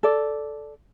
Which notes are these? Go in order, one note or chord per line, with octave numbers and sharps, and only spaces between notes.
A4 D5